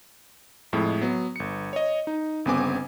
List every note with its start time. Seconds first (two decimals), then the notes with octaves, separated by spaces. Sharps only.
0.73 F2 A2 G#3
1.01 F#3 B3
1.36 G1 C#7
1.73 C#5 D#5
2.07 D#4
2.45 G1 C#3 B3 C4 G#5 D6